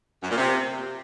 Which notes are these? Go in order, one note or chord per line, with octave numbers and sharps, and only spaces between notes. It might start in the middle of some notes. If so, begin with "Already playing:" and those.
F#2
A#2
C3